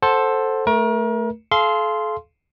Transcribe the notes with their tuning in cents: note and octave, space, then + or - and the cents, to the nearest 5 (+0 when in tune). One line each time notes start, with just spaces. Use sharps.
A4 +0 C5 +10 F#5 +0
A3 +0 A#4 +35
A4 -40 F5 -20 C6 -5